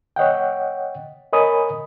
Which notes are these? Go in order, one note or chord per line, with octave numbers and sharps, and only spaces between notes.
C#5 D#5 F#5 G5
A#4 C#5 D#5 G#5 B5 D#6